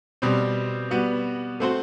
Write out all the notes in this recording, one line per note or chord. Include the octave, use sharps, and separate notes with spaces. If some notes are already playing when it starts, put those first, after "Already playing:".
B2 G3 C4
G3 B3 F#4
A3 C4 F#4 C5